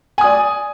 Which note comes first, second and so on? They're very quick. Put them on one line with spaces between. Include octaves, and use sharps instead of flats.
G#5 D#6 D5